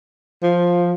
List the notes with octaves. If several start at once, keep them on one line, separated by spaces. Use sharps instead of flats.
F3